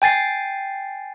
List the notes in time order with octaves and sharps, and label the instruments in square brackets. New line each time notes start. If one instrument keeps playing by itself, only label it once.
[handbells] G5 G#5 A6 C7